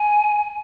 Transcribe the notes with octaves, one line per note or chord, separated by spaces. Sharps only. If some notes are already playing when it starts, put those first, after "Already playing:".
Already playing: G#5